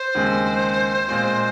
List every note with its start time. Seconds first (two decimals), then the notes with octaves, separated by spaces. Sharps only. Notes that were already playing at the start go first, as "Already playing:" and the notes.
Already playing: C5
0.15 D#2 C#3 G#3 C4
1.08 A#2 G#3 C4 F4